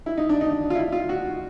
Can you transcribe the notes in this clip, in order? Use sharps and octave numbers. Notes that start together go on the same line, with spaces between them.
E4
D#4
D4
D#4
F4
E4
F4
F#4